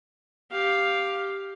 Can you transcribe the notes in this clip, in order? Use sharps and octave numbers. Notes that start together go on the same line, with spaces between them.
G4 F5